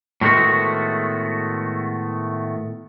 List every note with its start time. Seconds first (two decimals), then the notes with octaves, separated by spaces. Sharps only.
0.21 A2 D#3 G#3 A3 B3 F#4